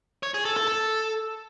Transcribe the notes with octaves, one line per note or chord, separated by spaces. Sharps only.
C#5
G#4
A4
A4
A4